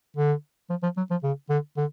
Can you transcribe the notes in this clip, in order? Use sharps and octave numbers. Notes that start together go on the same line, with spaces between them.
D3
F3
F3
F#3
F3
C#3
D3
D3